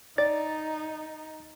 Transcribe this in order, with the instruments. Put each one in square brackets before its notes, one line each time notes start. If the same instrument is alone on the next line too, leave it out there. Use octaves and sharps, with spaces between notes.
[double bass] D#4 [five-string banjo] D5 [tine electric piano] A6